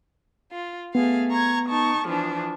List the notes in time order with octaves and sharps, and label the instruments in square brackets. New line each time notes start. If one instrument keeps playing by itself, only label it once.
[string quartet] F4
[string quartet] A3 G#4 F5 [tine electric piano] B3
[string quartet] A#5 C#6 G#6
D#4 A5 C#6
E3 F3 D4